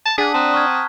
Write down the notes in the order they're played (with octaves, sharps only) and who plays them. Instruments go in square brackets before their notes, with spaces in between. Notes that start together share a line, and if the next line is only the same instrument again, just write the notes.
[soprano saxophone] A5
[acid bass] D4 [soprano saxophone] G#4 [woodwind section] F#5 D#6 [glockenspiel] B6
[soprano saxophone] C4 [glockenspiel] A5 A#5 F#6
[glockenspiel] C#6 F6 G#6